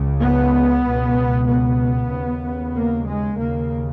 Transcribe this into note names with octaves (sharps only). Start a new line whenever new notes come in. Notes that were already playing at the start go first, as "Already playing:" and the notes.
Already playing: C#2 C#3
B3
C#2 B2
B3
D#2 C#3
A#3
G#3
D#2 C#3 A#3